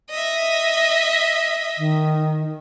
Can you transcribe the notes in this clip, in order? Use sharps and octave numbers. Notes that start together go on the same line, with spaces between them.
D#5 E5
D#3